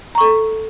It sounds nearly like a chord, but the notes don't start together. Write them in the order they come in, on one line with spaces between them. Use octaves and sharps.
A#5 C#6 A4